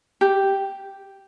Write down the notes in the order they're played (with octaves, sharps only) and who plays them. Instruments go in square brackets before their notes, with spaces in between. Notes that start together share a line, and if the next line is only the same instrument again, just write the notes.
[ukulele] G4